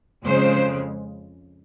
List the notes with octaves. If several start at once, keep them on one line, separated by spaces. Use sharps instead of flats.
F2 C#3 G#3 C5